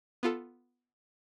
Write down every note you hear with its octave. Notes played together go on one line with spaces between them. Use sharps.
B3 F4 A4